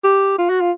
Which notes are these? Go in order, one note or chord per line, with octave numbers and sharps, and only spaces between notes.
G4
F4
F#4
F4